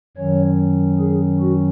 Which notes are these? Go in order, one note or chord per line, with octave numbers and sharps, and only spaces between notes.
F#2 D#3 F#3 C#4 C#5
G#4
F#4